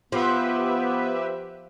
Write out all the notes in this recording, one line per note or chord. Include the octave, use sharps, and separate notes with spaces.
F3 B3 G4 B4 E5